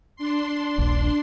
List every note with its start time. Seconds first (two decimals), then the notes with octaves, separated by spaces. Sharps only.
0.16 D4 C6
0.78 D#1 A#1